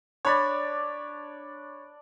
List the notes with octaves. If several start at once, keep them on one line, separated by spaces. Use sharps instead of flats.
D4 C#5 D5 B5